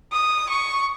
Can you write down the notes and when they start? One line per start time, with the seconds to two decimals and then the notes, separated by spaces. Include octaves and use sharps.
0.13 D#6
0.49 C#6